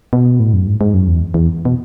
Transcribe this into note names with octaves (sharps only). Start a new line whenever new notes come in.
B2
A2
F#2
G#2
G#2
F#2
E2
E2
B2